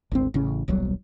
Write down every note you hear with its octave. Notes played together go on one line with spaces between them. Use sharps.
G#1 D2 C4
A1 C#3 C#4
D#1 B1 F#3 G3